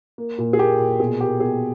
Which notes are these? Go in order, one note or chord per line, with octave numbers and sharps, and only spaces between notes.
A#3
A#2
G#4
A#3 G4
A#2
B2 G#4
A#3 G4
B2 G#4